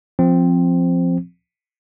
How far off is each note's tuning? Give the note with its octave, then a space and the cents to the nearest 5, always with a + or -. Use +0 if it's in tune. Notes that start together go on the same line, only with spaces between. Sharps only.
F3 +0 C4 +0